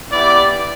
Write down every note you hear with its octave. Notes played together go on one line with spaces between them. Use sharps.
B3 E4 G4 D5